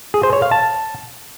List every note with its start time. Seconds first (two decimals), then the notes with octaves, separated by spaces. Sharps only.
0.14 G#4
0.23 C5
0.33 C#5
0.42 F5
0.51 A5